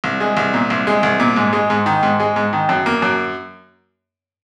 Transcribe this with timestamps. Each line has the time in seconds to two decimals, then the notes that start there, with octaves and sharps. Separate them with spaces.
0.04 C2
0.20 G#3
0.37 C2
0.54 A#2
0.70 C2
0.87 G#3
1.03 C2
1.20 A#2
1.36 G#2
1.53 G#3
1.70 G#2
1.86 D#3
2.03 G#2
2.20 G#3
2.36 G#2
2.53 D#3
2.69 F#2
2.86 A#3
3.02 F#2